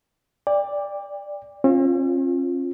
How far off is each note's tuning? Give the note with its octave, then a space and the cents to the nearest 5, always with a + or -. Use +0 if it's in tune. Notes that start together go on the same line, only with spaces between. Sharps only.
D5 +0 G5 +35
C#4 -45 F4 +0